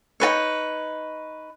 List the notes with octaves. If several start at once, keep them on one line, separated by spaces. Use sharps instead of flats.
D#4 F#4 B4 C#5